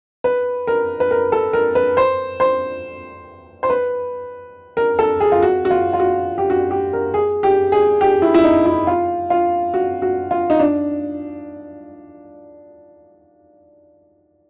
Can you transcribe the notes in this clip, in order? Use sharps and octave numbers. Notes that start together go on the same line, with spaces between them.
B4
A#4
B4
A#4
A4
A#4
B4
C5
C5
C5
B4
A#4
A4
G#4
F4
F#4
F#4
F4
F4
F#4
G4
F#4
G4
A#4
G#4
G4
G#4
G4
E4
E4
D#4
E4
F4
F4
F#4
F#4
F4
D#4
D4